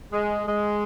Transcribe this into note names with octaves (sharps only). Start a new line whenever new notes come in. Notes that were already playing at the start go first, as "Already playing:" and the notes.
G#3
G#3